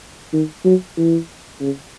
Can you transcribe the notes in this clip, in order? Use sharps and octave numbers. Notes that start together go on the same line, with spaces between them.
D#3
F#3
E3
C#3